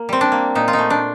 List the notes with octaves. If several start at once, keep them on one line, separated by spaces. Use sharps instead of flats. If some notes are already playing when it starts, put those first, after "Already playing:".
Already playing: A#3
G3 C4
D4
A#3
A#2 D#4
F4
D#4
A3
D4